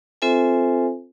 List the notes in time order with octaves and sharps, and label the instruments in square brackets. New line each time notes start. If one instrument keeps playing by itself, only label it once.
[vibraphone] C4 F4 A4 C5 E5 G#5